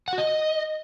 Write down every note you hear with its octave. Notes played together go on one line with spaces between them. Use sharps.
F#5
F#4
D#5